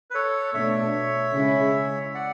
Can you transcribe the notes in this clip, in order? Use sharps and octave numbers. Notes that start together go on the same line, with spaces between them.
B4
A4 C#5
B2 A3 D4 C#5 E5
C#3 G#3 C#4 E4
D5 F#5